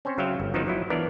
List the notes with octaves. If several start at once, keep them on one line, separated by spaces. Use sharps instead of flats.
C4 C#4 C5 C#5
C#3 F#3 E5 F5 G5
G1
D#3 F3 F#3 B3 D#4 C5
F3 F#3 E4
E3 B3 D4 A#4 D5